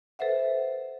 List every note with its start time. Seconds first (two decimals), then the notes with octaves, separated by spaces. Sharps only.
0.19 A4 B4 C5 E5 F#5